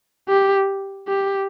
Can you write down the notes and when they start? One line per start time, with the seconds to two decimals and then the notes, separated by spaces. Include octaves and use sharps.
0.29 G4
1.08 G4